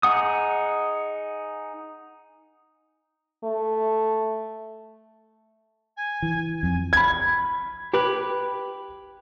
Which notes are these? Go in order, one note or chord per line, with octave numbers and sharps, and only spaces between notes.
D#4 G#4 F#5 D#6
A3
G#5
E3
F2 G#5
B5 G#6
G4 B4